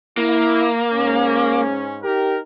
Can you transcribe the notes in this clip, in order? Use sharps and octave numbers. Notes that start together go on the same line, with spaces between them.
A#3 E4
G#2 C#4
D#4 G4 A#4